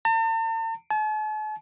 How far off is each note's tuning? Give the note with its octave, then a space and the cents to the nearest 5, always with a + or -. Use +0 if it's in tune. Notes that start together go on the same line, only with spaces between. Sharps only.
A5 +45
A5 -45